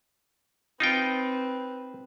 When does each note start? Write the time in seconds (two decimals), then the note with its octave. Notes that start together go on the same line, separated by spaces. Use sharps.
0.80 C4 D#4 F4 B4 G5